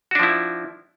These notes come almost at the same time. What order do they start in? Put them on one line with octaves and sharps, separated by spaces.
F#4 D4 F3 E4